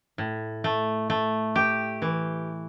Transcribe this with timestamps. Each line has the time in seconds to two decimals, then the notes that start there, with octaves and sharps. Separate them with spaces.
0.18 A2
0.64 A3
1.10 A3
1.56 G4
2.02 E3